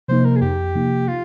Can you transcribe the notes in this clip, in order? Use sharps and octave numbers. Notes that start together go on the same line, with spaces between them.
C3 F3 A#3 D#4 C5
A#4
G#4
F2 G4
C3 F3 A#3 D#4
F4